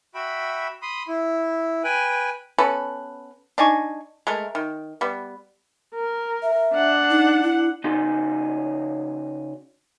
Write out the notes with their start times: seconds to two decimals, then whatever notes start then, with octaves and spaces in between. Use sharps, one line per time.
0.15 F#4 E5 G5 B5
0.82 B5 C6 D#6
1.08 E4
1.84 B4 G5 G#5
2.58 B3 C#4 A4 B4
3.58 D4 D#4 G#5 C#6
4.27 G#3 A3 A#4
4.55 D#3
5.01 G3 B3
5.95 A#4
6.42 E5
6.73 D4 F#5
7.10 D#4
7.43 E4
7.84 C#3 D#4 F#4 G#4 C6